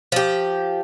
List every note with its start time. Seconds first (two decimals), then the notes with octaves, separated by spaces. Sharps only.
0.12 F3 G4